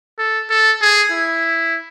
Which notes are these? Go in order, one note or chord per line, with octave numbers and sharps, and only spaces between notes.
A4
A4
G#4
E4